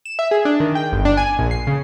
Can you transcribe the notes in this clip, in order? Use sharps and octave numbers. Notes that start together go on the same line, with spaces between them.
E7
E5
G#4
D4
D#3
G5
G1
D4
G#5
A#1
C7
C#3